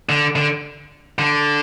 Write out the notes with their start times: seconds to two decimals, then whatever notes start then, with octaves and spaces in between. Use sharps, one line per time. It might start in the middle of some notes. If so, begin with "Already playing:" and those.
0.09 D3
0.36 D3
1.19 D3